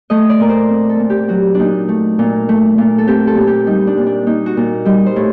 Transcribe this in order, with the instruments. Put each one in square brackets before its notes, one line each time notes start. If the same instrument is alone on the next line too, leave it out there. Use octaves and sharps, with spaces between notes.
[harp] A3 D#5
D5
A#2 A#4
C5
C4
A4
A#2
G4
F#3 F#4
A#2 D4 D#4
A3
A#2
A3
A#2
A4
C4 G4
A4
A#2
G4
G3 D#4
D4
A#2
D4
A#3 D#4
F#4
A#2
G3 D#4
C5
A2